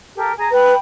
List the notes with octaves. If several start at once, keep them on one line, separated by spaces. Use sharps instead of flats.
G4 A4 A#4
G#4 G#5 A#5
B4 G5 B5